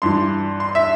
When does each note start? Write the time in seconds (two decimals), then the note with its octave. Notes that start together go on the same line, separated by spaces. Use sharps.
0.02 G2 E3 C6
0.60 C6
0.75 E5